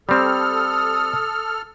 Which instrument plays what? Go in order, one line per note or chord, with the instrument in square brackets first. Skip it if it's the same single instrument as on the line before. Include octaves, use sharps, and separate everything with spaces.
[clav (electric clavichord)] G3 C4 [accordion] A4 F6 [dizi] D#6